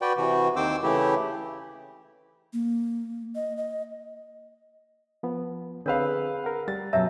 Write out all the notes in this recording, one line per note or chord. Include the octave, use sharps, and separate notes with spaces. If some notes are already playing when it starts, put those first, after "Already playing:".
F#4 B4 D5 G5
C3 E3 F#4
D#2 D#3 C4 C5 D6 E6
C#3 E3 A3 E4 G4
A#3
D#5
D#5
F3 B3
D3 C4 G#4 B4 C#5 F5 E6
A#4 F#5
G3 A6
F#2 B2 C#5 E5 A5 E6